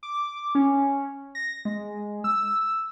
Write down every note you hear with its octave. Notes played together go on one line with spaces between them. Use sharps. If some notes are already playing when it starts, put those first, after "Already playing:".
D6
C#4
A#6
G#3
E6